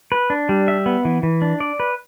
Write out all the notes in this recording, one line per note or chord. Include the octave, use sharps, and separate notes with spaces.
B4
D4
G3
E5
B3
E3
E3
D4
D5
B4